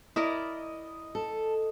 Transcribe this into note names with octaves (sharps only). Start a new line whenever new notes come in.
E4 A#4 D5 D#5
A4